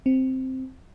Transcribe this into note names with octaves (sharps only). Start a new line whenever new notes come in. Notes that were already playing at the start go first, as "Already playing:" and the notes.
C4